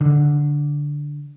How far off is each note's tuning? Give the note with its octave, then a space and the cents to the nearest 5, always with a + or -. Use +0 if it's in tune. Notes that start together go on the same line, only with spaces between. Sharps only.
D3 -5